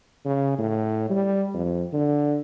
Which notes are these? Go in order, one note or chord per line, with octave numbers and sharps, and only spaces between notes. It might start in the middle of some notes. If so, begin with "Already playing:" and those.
C#3
A2
G3
F2
D3